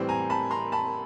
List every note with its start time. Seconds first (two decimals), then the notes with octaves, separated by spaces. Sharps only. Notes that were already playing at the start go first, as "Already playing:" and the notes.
Already playing: A2 E3 G3 C4
0.09 G#5 A#5
0.30 A5 B5
0.51 A#5 C6
0.72 A5 B5